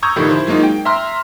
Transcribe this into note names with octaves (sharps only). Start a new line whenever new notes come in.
A#5 C#6 D#6 E6 G6 G#6
A2 D3 D#3 F3 E4 G4
E4 C5
F#3 G#3 A#3 D#4 F4
G5
E5 A#5 C6 F6